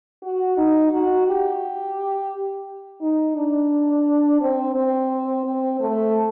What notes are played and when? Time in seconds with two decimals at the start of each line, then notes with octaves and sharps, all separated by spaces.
0.23 F#4
0.58 D#4
0.92 F#4
1.27 G4
3.02 D#4
3.36 D4
4.41 C4
4.76 C4
5.45 C4
5.80 A3